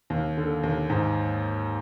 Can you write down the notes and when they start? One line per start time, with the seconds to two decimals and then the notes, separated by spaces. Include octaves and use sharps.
0.10 D#2
0.37 D3
0.63 D#2
0.90 G#2